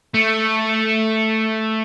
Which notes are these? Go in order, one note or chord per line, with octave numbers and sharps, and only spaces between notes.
A3